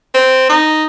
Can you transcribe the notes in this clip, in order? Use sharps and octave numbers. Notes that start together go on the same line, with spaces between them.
C4
D#4